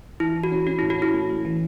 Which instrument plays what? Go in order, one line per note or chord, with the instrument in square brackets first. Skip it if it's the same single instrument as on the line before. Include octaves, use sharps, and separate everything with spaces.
[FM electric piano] E3 [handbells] E4
[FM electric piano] E3
[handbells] F#4
[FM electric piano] C#4
[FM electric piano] C#4 [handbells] F#4
[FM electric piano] A2 [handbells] E4
[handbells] F#4
[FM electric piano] C#4 [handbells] E4
[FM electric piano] A3
A3
E3